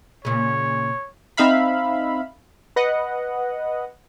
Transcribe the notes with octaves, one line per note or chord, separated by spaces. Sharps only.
A#2 C#3 C#5
C4 D#4 E5 F5 B5
B4 D#5 F#5